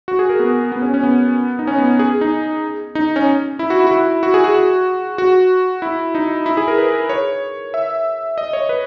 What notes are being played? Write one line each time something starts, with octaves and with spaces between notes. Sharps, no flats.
F#4
G#4
A#4
B3
B3
C#4
C#4
B3
D#4
C#4
B3
G#4
D#4
D#4
C#4
E4
F#4
E4
F#4
E4
F#4
G#4
F#4
F#4
E4
D#4
E4
G#4
A#4
B4
C#5
E5
D#5
C#5
B4